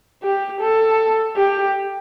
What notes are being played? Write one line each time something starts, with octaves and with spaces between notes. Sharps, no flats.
G4
A4
G4